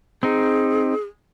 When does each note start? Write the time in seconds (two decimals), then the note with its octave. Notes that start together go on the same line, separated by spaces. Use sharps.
0.23 C4 D#4 G#4